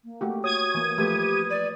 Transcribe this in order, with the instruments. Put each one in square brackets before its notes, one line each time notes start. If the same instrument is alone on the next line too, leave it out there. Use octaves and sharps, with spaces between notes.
[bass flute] A#3
[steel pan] A3 F#4 G4
[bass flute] F#4 [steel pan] C#5 [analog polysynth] D#6 G#6 D#7
[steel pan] E3 A#3
[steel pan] F3 A3 [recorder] G4 [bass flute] B4
[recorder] D5